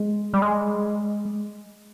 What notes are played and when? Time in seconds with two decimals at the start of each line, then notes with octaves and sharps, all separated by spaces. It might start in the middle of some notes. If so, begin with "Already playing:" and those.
Already playing: G#3
0.34 G3
0.42 G#3